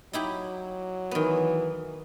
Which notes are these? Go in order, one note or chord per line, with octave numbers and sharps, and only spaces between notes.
F#3 D#4 E4 G4
D#3 E3 B3